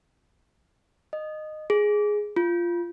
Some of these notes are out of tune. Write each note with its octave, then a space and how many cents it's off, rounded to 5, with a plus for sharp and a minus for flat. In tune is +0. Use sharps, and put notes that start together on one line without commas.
D#5 -15
G#4 +5
F4 -10